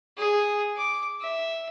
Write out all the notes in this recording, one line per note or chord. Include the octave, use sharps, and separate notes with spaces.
G#4
D6
E5